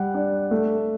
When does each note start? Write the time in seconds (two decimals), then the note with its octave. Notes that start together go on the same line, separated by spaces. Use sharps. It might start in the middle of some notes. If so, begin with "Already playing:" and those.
Already playing: G3 F#5
0.14 D4
0.51 A3